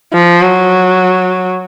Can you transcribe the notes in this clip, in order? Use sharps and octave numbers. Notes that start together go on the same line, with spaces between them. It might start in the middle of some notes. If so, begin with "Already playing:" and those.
F3
F#3